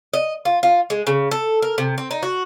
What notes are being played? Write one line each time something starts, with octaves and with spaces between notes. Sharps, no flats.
D#5
F4
F4
G#3
C#3
A4
A#4
C3
C4
D#4
F#4